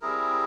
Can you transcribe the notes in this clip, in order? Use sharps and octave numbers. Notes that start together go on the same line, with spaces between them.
G3 C4 E4 G#4 A#4